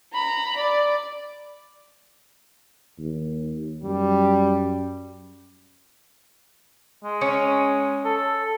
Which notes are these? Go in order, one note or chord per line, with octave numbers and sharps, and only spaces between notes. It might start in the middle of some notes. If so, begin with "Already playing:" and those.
A#5 B5
D5
D#2
F#2 G3
G#3
C#4
A4